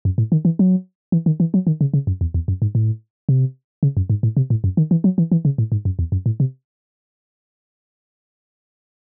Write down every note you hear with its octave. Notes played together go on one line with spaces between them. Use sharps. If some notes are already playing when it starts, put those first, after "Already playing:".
F#2
A2
D#3
E3
F#3
E3
D#3
E3
F#3
D#3
C#3
C#3
F#2
E2
E2
F#2
G#2
A2
C3
C#3
F#2
G#2
A2
C3
A2
F#2
D#3
E3
F#3
E3
E3
C#3
A2
G#2
F#2
E2
F#2
A2
C3